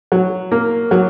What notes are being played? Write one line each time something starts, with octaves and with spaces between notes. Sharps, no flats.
F#3
A#3
F#3